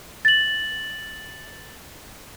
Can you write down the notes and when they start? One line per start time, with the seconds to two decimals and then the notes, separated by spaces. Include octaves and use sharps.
0.25 A6 F#7